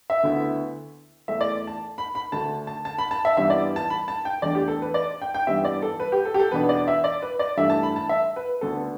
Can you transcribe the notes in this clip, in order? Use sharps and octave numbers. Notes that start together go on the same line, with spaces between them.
E5
D2 D3 B3 E4
E2 E3 A3 E5
D5
A5
B5
B5
D2 D3 A3 D4 A5
A5
A5
B5
A5
E5
G2 E3 G3 B3 E4 E5
D5
A5
B5
A5
G5
E2 E3 A3 D4 D5
G4
A4
B4
D5
G5
G5
G2 E3 G3 B3 E5
D5
A4
B4
G4
A4
G4
A4
E2 B2 B3 D4 B4
D5
E5
D5
B4
D5
G2 E3 A3 D4 E5
A5
B5
A5
E5
B4
D2 D3 B3 D4 A4